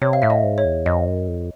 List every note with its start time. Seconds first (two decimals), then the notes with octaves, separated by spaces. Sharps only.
0.02 C3 C#5
0.13 F5
0.22 A2 E5
0.30 D#5
0.44 G#2
0.58 C#5
0.65 E2
0.86 F2 D#5
1.07 F#2
1.28 F2